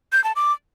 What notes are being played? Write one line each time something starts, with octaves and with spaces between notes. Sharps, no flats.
G6
A5
D6